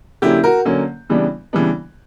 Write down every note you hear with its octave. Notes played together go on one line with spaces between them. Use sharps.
D3 F#3 A#3 C#4 E4 G4
F#4 A#4
D3 F#3 A#3 C#4
C#3 E3 G3 B3 D4
C#3 E3 G3 B3 D4